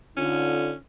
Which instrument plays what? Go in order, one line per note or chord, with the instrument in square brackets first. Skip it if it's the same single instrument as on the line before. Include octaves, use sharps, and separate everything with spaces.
[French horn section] D3 D#4 F4 [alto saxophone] C#4